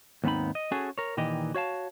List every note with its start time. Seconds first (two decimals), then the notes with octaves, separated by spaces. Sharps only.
0.24 D#2 G#2 B3 C4 D#4 B5
0.55 D#5
0.72 C#4 F#4 G#4 A4
0.98 A#4 C#5
1.17 A#2 D#3 E3 G4 D#5
1.55 F#4 C#5 F5 A5